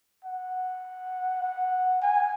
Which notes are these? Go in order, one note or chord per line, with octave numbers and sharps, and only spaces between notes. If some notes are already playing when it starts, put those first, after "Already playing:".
F#5
F#5
G#5